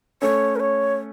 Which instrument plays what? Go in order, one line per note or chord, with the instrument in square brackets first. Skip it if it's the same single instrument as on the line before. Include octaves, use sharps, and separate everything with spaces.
[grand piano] A3 C#4 [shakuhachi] C#5
[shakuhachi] A#4
C#5